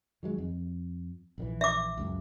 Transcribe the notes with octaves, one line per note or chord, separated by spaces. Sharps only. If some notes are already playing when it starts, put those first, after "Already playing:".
D#3 F#3 G#3
F2
A#1 D3 E3
E5 D6
C#2 F#2